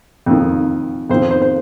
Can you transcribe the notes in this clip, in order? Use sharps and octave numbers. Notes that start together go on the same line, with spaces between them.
F2 D#3
F2 D#3 C5
C5
C5